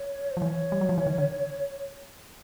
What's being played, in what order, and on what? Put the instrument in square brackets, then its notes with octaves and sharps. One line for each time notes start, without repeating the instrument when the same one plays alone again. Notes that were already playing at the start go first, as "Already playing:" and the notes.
Already playing: [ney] C#5
C5
[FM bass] F3
[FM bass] E3 [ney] C#5
[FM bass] G3
F#3
F3
E3
D#3
D3